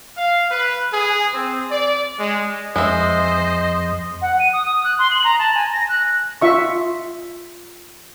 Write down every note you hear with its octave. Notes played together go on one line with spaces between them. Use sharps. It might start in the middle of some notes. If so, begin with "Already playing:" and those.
F5
B4
G#4
C4
D5
G#3
F2 G#3 C5 D#5 E5
F#5
D#7
D#6
D#6
F#6
C6
F#7
A#5
A5
G#5
A#6
F#6
F4 E5 C#6